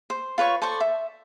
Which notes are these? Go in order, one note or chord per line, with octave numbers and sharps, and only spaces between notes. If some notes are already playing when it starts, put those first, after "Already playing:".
C5
F4 B4 C#5 C#6
A4 C5 D5 C#6
E5